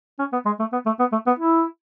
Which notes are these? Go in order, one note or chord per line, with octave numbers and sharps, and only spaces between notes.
C#4
B3
G#3
A3
B3
A3
B3
A3
B3
E4